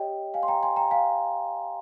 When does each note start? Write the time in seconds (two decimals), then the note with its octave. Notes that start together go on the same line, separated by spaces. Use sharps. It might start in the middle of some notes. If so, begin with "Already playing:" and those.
Already playing: G4 C#5 D#5 G5
0.34 F5 G#5
0.43 C6
0.48 G5 A#5
0.63 G#5 C6
0.76 G5 A#5
0.91 F5 G#5